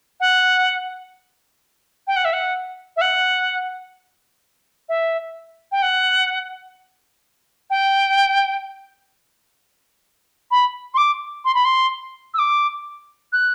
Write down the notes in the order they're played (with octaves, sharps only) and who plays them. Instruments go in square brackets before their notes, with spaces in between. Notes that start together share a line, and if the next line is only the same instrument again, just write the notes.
[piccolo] F#5
G5
F#5
E5
F#5
E5
F#5
E5
G5
F#5
G5
B5
C6
D6
C6
B5
C6
E6
D6
F#6